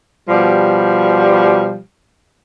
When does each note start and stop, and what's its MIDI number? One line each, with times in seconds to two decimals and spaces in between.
0.28 1.79 47
0.28 1.79 53
0.28 1.79 55